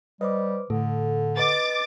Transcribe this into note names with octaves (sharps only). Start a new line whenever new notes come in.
G3 B4 C5 D#5 D6
A2 D3 A4
B4 D#5 D6 A6